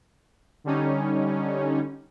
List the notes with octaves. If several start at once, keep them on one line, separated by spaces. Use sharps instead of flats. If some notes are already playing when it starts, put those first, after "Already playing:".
D3 G3 C#4 D#4